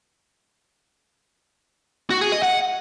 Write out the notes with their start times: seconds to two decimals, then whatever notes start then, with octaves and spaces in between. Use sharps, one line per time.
2.10 F#4
2.21 G#4
2.32 D#5
2.43 F#5